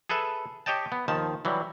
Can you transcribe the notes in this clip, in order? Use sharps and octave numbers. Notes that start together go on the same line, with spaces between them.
G#4 A4 B4 E5
G4 C#5 D#5 G5 A5
B3
D#2 D#3 F3 A5
E3 F#3 G3